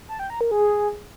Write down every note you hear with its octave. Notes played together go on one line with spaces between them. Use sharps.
A5
G5
A#5
A#4
G#4